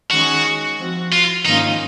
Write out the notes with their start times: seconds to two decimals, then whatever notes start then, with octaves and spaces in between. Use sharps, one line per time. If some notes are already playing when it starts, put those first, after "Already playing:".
0.11 D#3 G#3 C#4 F#4 G#4
0.78 F3 C4 F#4
1.12 F4
1.45 G#2 D#3 A#3 C#4 D#4 F4